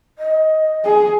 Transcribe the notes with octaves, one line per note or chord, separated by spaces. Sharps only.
D#5
G#4